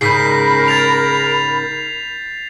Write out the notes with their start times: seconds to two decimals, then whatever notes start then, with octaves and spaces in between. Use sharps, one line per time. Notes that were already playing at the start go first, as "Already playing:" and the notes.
0.01 G#2 C#3 A#4 B5 G6 B6 C7
0.68 G#6 A6 F7